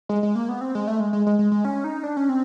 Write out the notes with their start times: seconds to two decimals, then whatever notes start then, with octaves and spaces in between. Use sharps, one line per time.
0.09 G#3
0.23 G#3
0.35 A#3
0.49 B3
0.61 C4
0.75 G#3
0.88 A3
1.00 G#3
1.13 G#3
1.27 G#3
1.39 G#3
1.52 G#3
1.65 C#4
1.84 D#4
2.04 D4
2.17 C#4
2.29 C4